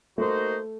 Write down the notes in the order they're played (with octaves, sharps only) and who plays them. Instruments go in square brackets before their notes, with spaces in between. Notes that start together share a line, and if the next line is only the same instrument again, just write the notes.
[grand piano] A3 [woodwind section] A#3 D#4 F#4 C5